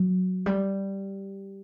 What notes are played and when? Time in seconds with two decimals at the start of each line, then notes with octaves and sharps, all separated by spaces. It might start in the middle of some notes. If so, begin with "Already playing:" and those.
Already playing: F#3
0.46 G3